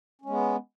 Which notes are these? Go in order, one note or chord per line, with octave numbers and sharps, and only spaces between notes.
G#3 B3 C#4